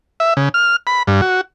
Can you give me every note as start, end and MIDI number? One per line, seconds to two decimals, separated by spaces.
0.20 0.34 76
0.37 0.49 49
0.54 0.76 89
0.87 1.03 83
1.07 1.21 43
1.22 1.41 66